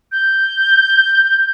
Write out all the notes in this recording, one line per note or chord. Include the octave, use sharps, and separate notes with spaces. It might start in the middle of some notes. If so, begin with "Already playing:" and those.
G6